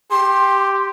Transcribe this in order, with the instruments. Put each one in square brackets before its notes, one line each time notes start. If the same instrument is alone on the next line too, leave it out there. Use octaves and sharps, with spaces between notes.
[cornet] G4 [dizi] C6